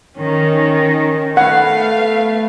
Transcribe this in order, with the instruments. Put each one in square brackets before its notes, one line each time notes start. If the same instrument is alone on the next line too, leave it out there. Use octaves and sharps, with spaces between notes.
[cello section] D#3 [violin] C#4
[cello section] A3 [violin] B3 F5 [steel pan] F#5